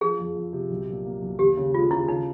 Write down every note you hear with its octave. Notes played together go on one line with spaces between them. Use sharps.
F3 G#4
F2
F2
C3
B1
A#2
A#3
B1
D#2 G4
C#3
G#3 F4
C#3 E4
C#3 D#4